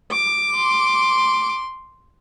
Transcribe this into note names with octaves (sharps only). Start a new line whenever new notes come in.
D6
C6